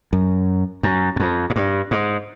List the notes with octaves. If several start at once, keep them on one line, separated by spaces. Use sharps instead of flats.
F#2
F#2
F#2
F2
G#2
G2
G#2